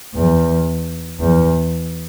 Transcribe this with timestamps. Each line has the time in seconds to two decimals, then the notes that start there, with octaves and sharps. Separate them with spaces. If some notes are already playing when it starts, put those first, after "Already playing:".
0.14 E2
1.19 E2